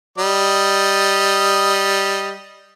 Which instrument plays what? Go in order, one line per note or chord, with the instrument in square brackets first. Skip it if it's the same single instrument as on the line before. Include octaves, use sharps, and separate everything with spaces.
[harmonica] G3 D#5